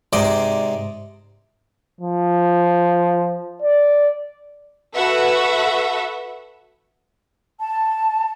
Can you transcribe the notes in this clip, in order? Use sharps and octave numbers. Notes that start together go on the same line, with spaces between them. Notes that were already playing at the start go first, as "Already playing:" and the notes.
G#2 C3 D5 D#5
F3
D5
F#4 A4 B4 E5 F#5
A5